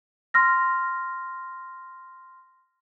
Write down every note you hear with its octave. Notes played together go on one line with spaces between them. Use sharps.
C6 F6 A#6